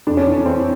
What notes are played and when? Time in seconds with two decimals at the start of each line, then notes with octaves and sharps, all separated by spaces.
0.07 F2 D4
0.17 C#4
0.27 E3 D4
0.45 E3 C4